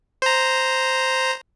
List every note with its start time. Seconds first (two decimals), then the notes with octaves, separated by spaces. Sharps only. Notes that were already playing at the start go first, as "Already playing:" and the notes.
0.22 C5 A#5